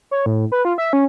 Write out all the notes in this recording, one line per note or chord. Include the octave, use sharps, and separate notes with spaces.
C#5
A2
B4
F4
E5
C#4